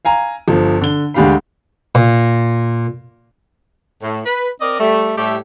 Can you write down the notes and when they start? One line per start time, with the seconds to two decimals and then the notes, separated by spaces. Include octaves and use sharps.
0.05 F5 G#5 A#5
0.48 G1 F3
0.81 D3 G7
1.14 D2 G#3 D4 G4 F5 B5
1.95 A#2
4.03 A2
4.25 B4
4.60 C4 A#4 D5 D#5
4.80 G3 A3
5.18 A2 G3 A3 G4 E5